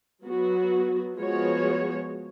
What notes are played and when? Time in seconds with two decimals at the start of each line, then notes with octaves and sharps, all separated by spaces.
0.24 F#3 B3 F#4
1.18 F3 G#3 B3 F#4 C#5